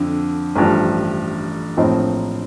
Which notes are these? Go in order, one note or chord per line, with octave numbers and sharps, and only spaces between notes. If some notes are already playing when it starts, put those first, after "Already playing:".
Already playing: F2 D3
A1 G2 F3
A#1 A2 F3 C4 D#4